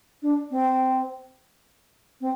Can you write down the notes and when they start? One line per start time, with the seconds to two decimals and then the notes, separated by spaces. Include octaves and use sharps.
0.22 D4
0.50 C4
2.20 C4